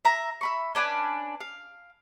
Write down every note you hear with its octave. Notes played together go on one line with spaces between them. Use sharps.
E5 A#5
E5 B5 C#6
C#4 D4 B4 G#5
F5